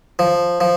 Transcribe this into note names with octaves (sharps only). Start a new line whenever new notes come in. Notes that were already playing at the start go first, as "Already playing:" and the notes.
F3
F3